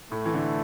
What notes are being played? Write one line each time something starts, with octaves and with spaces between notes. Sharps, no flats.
A2 A3
E3
D3